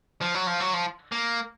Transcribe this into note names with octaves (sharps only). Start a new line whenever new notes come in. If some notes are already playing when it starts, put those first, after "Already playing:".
F3
F#3
F3
F#3
F3
A#3